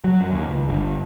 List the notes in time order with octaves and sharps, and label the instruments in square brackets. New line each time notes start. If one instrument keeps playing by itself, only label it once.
[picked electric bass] F#3
F#2
D#2
C#2
G1